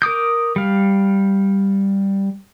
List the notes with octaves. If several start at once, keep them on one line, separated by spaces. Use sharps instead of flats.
A#4 D6 D#6 G6
G3 F5